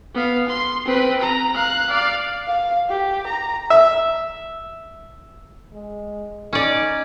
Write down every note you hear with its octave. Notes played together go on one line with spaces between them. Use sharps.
B3 F5
C6
C4 B4
A#5
F5 F#6
D5 F5
F5
G4
A#5
E5
G#3
C#4 D#4 D5